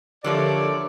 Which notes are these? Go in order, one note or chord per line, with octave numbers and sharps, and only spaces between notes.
D3 F3 A3 G4 A4 A#4 C#5 D5